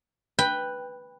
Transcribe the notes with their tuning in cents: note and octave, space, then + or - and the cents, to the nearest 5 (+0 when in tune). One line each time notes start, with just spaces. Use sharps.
B4 +0 G5 +10